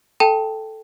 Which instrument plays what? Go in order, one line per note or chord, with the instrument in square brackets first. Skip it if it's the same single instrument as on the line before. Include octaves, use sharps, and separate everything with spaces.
[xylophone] A4 G5 A5